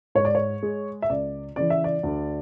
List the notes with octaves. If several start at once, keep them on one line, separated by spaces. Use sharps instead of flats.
G#2 C#5
D5
C#5
G#3
E5
C#2 D5
C#3 E3 D5
E5
D5
D2